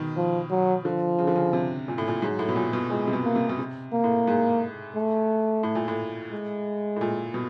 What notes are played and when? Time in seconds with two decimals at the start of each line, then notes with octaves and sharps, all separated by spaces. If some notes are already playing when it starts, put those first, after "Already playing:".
Already playing: B2 D#3
0.16 F3
0.50 F#3
0.84 D3 F3
1.19 C#3
1.27 D3
1.36 C#3
1.53 C3
1.88 A#2
1.98 A2
2.08 A#2
2.21 G#2 F#3
2.39 A2
2.49 B2
2.56 A#2
2.73 B2
2.90 A#2 G#3
3.07 C3
3.13 B2
3.24 A#3
3.35 C3
3.49 B2
3.59 C3
3.92 A#3
4.04 A2
4.27 G#2
4.95 A3
5.63 A2
5.75 A#2
5.88 A2
6.32 G#3
6.96 A2
7.01 A#2
7.34 B2